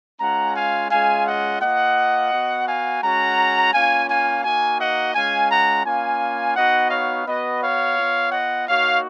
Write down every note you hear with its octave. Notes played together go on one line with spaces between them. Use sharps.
G#3 C#4 F4 F#5 A#5
F5 G#5
G#3 C#4 F4 F5 G#5
D#5 F#5
A#3 F4 D#5 F#5
B3 F#4
F5 G#5
G#3 C#4 F#4 F#5 A#5
A#3 C#4 F4 F5 G#5
F5 G#5
A#3 D#4 F#4 F5 G#5
D#5 F#5
G#3 C#4 F4 F5 G#5
F#5 A#5
A#3 C#4 F4 F5 G#5
B3 D#4 F#4 D#5 F#5
C#5 F5
B3 F#4 B4 D#5
C#5 F5
B3 F4
D#5 F#5
A#3 D#4 F#4 C#5 F5